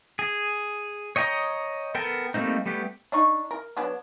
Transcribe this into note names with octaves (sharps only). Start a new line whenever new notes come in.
G#4
C#5 D#5 G5 A#5 D#6
B3 A4 A#4 G5
G3 A3 A#3 C4 D#4
G3 A3 B3 G4
D4 D#4 C#6
A#4
F#3 B3 D4